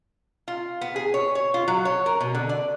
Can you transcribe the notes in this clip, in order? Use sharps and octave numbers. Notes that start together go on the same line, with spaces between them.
F4
B3
G#4
C#5
C#5
F4
F#3
C#5
A#4
B2
D3
D5